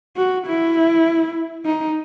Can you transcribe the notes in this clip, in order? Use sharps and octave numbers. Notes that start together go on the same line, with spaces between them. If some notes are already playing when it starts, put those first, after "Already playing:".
F#4
E4
D#4